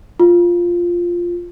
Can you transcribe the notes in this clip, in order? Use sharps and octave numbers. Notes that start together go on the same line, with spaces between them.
F4